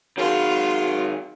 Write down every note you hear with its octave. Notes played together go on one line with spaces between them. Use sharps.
D#3 F#3 F4 G#4